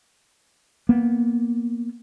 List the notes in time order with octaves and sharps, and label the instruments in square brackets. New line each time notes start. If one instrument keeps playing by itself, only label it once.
[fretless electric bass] A#3 B3